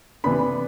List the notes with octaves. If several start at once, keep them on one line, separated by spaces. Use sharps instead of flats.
C3 E3 B3 D4 B5